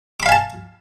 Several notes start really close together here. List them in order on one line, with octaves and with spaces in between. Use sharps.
D6 B5 F5 G#5 A5